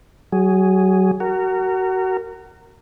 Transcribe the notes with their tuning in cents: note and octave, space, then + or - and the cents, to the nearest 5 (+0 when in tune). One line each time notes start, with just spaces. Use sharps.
F#3 +30 G#4 +0
F#4 +25 A#4 -20